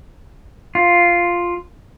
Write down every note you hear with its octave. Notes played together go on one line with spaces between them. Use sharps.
F4